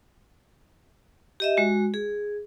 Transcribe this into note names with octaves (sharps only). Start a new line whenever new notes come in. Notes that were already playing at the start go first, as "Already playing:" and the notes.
G4 D#5 E5
G#3 F#4
G#4